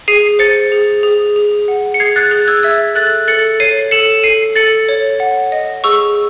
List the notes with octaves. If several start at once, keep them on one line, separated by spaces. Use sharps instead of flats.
G#4 C7 D#7
C5 A6 C#7
G#4
G#4
G#4
F#5
C#7
G#4 G#6 C7
F#6 A6
G#4 F#6 A6
E6 G#6
E5 E6 G#6
A4 F#6 A6
A4 A6 C#7
C#5 C7 D#7
A4 C#7 E7
A4 C7 D#7
A4 A6 C#7
C#5
F#5
D#5
G#4 C#6 E6